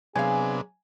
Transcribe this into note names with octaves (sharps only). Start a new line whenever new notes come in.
C3 F#3 B3 D4 G#4 F5 G#5